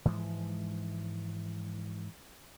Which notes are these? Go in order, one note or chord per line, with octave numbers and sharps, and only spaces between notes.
G#2 E3 F3 G#3